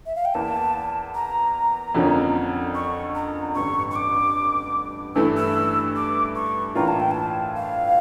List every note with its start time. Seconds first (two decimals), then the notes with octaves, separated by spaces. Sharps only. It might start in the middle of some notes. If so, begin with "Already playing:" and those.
0.06 E5
0.16 F5
0.25 G5
0.34 E2 E3 A#3 A5
1.15 A#5
1.95 F2 D3 F3 A#3 C#4
2.75 C#6
3.15 A#5
3.55 A1 G2 D3 C#6
3.91 C#6
3.96 D6
5.15 G2 E3 A3 E4 E6
5.37 E6
5.96 D6
6.36 C#6
6.75 A2 E3 A#3 D4 F4 A#5
6.88 A5
7.00 G5
7.11 A5
7.56 F5